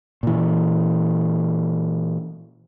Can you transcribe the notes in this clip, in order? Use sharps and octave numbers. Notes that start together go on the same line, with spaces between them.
A#2 E3